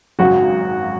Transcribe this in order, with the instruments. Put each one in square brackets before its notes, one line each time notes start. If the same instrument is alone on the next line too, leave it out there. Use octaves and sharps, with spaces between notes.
[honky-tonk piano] G#1 F#2 C#3 F#3 [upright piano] F#4